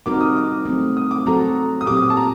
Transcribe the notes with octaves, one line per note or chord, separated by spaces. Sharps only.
G3 C4 D#4 F#4 A#4 D6
D#6
D6
F#3 A3 C4
D#6
D6
F#3 C4 F#4 A4 A#5
D#6
A#2 F#3 C4 G4 D6
D#6
A5
A#5